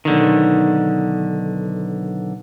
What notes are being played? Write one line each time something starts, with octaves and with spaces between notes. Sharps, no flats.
B1 D3 D#3